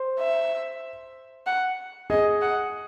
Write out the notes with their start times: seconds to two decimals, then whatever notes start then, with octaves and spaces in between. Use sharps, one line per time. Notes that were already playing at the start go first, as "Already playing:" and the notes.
Already playing: C5
0.19 E5
1.46 F#5
2.10 G#4 D#5
2.41 F#5